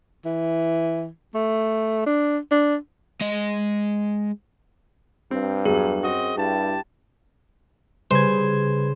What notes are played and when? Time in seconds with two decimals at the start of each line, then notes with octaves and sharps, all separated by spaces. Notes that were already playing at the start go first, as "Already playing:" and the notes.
0.25 E3
1.35 A3
2.06 D4
2.52 D4
3.21 G#3 D#5
5.31 G2 C4
5.65 E2 F#3 G#4
6.03 F#2 C4 F#4 D#5
6.36 G2 E4 G4 A5
8.11 C#3 G3 B4 C5 G#6